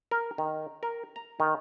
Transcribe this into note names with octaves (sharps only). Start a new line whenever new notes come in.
A#4
D#3
A#4
A#5
D#3